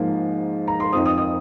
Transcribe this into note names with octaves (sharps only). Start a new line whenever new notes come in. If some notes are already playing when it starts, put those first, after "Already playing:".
Already playing: G#2 F3 A#3
A#5
C6
F2 F3 C4 D#4 D#6
D#6
D#6